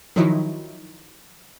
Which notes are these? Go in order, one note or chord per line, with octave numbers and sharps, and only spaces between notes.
D#3 F3 F#3 D#4 E4